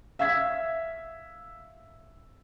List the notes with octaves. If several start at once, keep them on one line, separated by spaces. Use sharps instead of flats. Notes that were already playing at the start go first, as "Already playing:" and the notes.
E5 F5 E6 G#6 B6